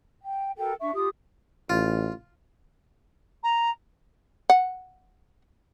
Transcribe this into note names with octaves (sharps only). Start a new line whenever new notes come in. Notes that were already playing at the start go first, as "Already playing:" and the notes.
G5
F#4 A4 A#4 G5
D4 E5 C#6
F4 G4 D#6
A1 F4
A#5
F#5